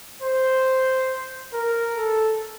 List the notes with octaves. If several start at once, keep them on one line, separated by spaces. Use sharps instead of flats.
C5
A#4
A4